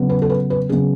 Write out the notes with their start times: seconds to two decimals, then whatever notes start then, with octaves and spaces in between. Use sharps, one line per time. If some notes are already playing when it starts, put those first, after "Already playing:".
Already playing: C#3 F#3 B3
0.09 B4
0.22 A4
0.30 B4
0.50 B4
0.69 C#3 F#3 B3 G#4